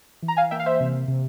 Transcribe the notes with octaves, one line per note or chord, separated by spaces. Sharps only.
E3
A#5
F5 G#5
A#3 E5 G5
F5
C5 E5
C3
C3